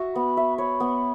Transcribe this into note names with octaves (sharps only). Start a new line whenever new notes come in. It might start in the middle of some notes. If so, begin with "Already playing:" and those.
Already playing: F#4 E5
B3 B5
E5
C#5 B5
B3